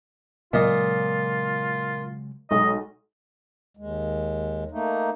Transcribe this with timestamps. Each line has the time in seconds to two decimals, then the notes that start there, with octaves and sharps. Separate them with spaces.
0.53 A#2 C#3 F#3 G#3 F4 D#5
2.51 B1 G#3 D#5
3.77 D#2 G#3
4.71 A3 A#3 D#4